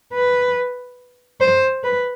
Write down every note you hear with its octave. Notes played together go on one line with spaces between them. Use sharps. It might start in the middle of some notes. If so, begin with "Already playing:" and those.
B4
C5
B4